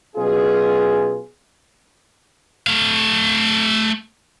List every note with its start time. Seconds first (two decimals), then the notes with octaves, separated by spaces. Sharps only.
0.16 B2 F#3 C#4 F4 G#4
2.67 A3 F5